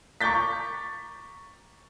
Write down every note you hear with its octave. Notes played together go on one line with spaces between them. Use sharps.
A#5 C#6 D6 G6 A6 B6